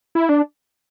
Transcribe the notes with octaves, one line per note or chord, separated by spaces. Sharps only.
E4
D4